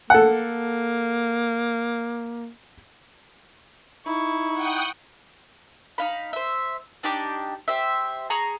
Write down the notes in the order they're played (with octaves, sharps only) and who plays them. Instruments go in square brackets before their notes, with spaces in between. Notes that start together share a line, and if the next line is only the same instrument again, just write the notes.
[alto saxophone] A#3 [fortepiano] A4 F#5
[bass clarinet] D#4 [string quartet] E4 [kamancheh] C#6
[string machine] F#5 G5 D#6
[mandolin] D#4 F5 B5
C5 E5
D4 D#4 G4 D6
G4 C5 E5
G#4 A#5 C#6